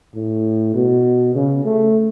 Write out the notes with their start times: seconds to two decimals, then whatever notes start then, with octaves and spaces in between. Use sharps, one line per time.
0.15 A2
0.74 B2
1.35 C#3
1.64 A3